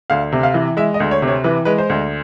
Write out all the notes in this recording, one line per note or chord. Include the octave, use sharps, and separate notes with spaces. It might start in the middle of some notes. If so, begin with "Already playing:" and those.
D2 F5
C3
F5
E3
G#3 E5
D#5
D2
C#5
C3
C#5
E3 B4
G#3 B4
C5
D2